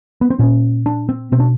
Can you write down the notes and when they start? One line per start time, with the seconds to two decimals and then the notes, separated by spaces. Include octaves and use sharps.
0.21 B3
0.30 C4
0.39 A#2 C#4
0.86 D4
1.09 C4
1.32 B2 C4
1.40 D4